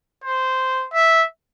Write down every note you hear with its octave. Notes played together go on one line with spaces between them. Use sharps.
C5
E5